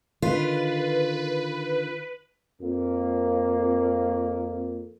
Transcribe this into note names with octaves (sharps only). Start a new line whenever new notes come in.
D3 D#3 F4 B4
F2 A#3